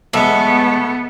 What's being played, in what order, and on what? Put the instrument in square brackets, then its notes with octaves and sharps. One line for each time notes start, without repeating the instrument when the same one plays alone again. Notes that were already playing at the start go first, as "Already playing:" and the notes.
[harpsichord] B1 E2 G#3 [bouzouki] A3 [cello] B3